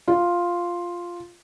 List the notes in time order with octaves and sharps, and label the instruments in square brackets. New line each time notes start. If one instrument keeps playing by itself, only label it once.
[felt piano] F4